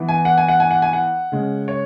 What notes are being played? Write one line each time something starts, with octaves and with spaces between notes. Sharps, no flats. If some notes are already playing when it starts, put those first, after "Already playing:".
Already playing: E3 B3
G#5
F#5
G#5
F#5
G#5
F#5
G#5
F#5
C#3 G#3 C#4
C#5